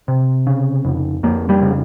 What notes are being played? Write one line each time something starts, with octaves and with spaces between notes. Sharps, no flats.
C3
C#3
F2
F2 A#3
G3
C#3